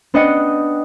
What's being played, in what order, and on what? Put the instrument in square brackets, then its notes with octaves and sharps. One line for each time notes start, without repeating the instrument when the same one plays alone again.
[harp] B3 D4 D#5 F#5 G5 C#7